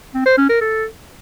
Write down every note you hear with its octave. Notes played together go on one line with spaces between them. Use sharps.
C4
C5
C#4
A#4
A4